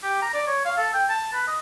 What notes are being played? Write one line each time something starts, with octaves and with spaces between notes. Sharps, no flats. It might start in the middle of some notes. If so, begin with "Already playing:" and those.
G4
A#5
D5
C#5
F5
A4
G5
A5
B4
D#5